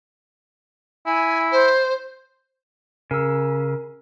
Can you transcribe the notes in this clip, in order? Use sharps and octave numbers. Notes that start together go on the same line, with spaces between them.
E4 G#5
C5
C#3 A#4 E6